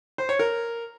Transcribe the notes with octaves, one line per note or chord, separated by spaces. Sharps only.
C5
C#5
A#4